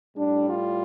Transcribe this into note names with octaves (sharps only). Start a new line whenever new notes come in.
A2 G3 D4
F4